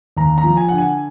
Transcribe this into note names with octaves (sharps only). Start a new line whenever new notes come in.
D#2 A#5
A#5
F3
G#5
D3 F#5
G#5